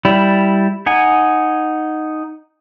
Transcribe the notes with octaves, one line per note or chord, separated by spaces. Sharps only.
G3 E4
D#4 F#5 G#5